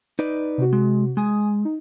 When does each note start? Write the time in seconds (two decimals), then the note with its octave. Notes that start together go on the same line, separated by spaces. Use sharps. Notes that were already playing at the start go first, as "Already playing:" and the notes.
0.19 D#4 B4 D5
0.58 C3 F#4
0.73 G#3
1.17 G#3 G#5 D#6
1.65 D#4